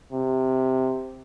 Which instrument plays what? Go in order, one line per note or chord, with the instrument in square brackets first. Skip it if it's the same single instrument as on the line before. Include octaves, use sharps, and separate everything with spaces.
[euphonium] C3